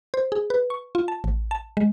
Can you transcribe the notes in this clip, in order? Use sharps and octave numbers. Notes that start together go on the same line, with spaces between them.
C5
G#4
B4
C#6
F4
A5
A1
A5
G#3